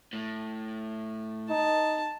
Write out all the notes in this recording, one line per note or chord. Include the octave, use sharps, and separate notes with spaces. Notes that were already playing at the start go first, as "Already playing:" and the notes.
A2
D#4 A5